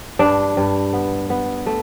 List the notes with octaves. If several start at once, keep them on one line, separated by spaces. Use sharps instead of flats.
G2 D4
G2
B3
B3
A3